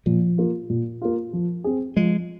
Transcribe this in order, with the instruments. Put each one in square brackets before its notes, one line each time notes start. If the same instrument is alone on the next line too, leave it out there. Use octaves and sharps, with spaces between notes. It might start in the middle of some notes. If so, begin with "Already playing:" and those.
[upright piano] A#2 [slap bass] F3
[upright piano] A#3 F4
A#2
A#3 F4
F3
C4 G#4
[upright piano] F3 [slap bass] G#3